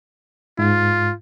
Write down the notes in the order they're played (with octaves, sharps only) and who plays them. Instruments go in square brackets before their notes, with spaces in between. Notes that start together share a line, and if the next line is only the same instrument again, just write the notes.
[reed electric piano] G#2 [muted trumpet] F4